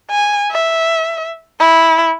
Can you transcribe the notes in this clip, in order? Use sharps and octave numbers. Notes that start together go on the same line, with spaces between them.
G#5
E5
E4